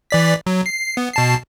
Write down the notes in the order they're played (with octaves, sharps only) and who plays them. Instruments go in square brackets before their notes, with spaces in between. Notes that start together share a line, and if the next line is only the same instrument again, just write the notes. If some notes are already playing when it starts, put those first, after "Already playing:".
[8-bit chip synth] E3 D5 B6
F#3
C7
B3
B2 A5 C7